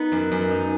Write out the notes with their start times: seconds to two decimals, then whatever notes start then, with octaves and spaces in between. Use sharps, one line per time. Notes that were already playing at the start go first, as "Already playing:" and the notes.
Already playing: B3 D#4
0.12 F#2
0.32 F#2
0.51 D#4